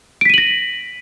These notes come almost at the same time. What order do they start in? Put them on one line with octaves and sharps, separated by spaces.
D7 B6 D#7 F#7 A#6